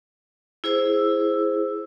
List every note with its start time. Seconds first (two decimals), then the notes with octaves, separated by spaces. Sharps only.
0.64 E4 G#4 C5 E6